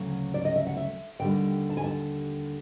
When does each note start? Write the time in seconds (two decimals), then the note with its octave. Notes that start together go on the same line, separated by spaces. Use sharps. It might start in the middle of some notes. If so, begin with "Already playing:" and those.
Already playing: D2 C#3 F#3
0.34 D5
0.45 D#5
0.56 E5
0.66 F#5
0.77 E5
1.19 D#2 D3 G3 G5
1.70 A5
1.77 G#5
1.84 A5